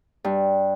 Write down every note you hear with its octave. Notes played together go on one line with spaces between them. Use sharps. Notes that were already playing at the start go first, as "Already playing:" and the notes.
G2